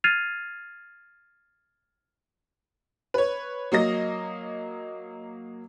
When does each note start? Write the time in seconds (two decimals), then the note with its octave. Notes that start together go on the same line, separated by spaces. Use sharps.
0.04 F6 G#6 A6 C7 D#7 F7
3.14 B4 C#5
3.72 F#3 A#3 D#5 A#6